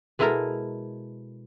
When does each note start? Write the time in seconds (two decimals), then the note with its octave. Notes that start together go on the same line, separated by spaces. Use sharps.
0.19 B2 G#3 E4 A4 A#4 A#5